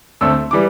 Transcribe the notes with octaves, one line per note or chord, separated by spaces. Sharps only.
D2 D3 A3 C4 E6
E3 G3 D6